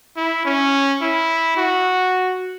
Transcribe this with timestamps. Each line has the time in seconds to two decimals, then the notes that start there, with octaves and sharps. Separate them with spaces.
0.17 E4
0.45 C#4
1.02 E4
1.57 F#4